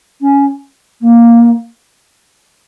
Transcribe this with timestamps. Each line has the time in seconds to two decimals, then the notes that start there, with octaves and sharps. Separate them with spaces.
0.20 C#4
1.01 A#3